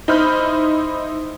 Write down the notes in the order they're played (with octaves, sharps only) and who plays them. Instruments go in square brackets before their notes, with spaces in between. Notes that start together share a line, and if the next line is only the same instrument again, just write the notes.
[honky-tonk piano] D#4 E4 C5 B5 F6 G6